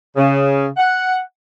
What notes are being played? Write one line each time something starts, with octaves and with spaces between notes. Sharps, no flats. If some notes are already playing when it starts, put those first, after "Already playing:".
C#3
F#5